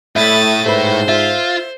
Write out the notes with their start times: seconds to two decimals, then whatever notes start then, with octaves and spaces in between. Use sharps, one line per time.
0.16 A2 A3 E4 E5 D#6 A6
0.66 G#2 A4 B4 C5
1.09 F4 E5